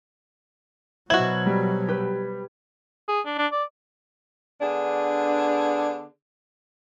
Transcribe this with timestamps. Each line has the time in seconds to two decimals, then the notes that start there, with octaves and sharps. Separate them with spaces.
1.10 B2 F#3 E4 F#4 C5 D#5 G#6 F#7
1.46 G3
1.88 G4 B4
3.08 G#4
3.25 D4
3.38 D4
3.52 D5
4.60 D3 B3 D4 G#4